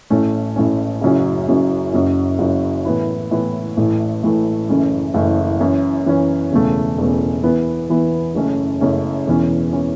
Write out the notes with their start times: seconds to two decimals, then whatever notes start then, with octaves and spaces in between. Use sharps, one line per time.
0.10 A1 A2 A3 C#4
0.56 A1 A2 A3 C#4
1.01 F#1 F#2 C#3 F#3 C#4
1.48 F#1 F#2 C#3 F#3 C#4
1.93 F#1 F#2 F#3
2.39 F#1 F#2 F#3
2.85 A2 E3 B3 E4
3.31 A2 E3 B3 E4
3.77 A1 A2 E3 A3
4.23 A1 A2 E3 A3
4.69 F#1 F#2 E3 A3 C#4
5.14 F#1 F#2 E3 A3 C#4
5.60 F#2 E3 C#4
6.06 F#2 E3 C#4
6.51 E1 E2 C#3 A3
6.98 E1 E2 C#3 A3
7.43 E2 E3 B3 E4
7.89 E2 E3 B3 E4
8.35 F#1 F#2 C#3 A3 C#4
8.81 F#1 F#2 C#3 A3 C#4
9.27 E1 E2 E3 C#4
9.73 E3 C#4